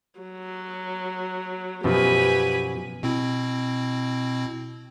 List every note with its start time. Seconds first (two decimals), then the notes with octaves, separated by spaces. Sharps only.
0.19 F#3
1.84 F#2 B2 F3 G4 B4 G#5
3.03 B2 C4 E4